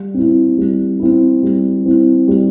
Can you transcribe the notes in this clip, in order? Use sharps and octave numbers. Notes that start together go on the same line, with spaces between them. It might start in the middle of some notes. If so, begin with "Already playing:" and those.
Already playing: G3
C4 E4
G3
C4 E4
G3
C4 E4
G3